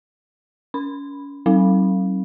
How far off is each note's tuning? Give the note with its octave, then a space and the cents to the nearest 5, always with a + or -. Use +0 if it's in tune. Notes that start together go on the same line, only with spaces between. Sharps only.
C#4 +30 B5 +0
F#3 +45 C4 +40